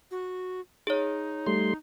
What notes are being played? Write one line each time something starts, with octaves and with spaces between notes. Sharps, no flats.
F#4
D#4 G#4 C#5
G3 A3 C6